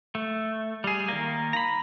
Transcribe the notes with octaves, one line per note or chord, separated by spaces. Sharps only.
A3
G3 G#4
D#3 A#3
A#5 B5